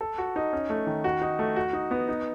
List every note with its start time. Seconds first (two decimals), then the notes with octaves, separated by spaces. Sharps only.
0.01 A4
0.18 F#4
0.36 D#4
0.53 C#4
0.70 A3
0.87 D#3
1.04 F#4
1.22 D#4
1.39 A3
1.56 F#4
1.73 D#4
1.91 B3
2.09 D#4